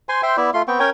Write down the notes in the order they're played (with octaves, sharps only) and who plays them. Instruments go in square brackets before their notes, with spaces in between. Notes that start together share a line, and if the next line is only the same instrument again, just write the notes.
[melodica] C5 G#5 C6
C5 E5 G5 C6
B3 E4 D5 E5
A3 F4 C6
B3 C4 G5 C#6
C#4 A#4 C#5 G5